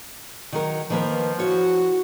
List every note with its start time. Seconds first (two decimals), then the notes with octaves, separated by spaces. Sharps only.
0.52 D#3 F#3 A#4
0.90 D#3 F3 A#3 B4
1.39 E4 F#4 C#5